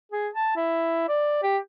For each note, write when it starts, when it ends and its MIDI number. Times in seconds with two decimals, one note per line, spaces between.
0.12 0.29 68
0.35 0.56 81
0.56 1.04 64
1.08 1.40 74
1.43 1.58 67